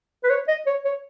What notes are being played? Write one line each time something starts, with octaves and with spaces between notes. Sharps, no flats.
B4
C#5
D#5
C#5
C#5